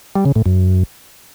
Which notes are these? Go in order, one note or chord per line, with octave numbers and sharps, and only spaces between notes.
G3
C#3
A2
F#2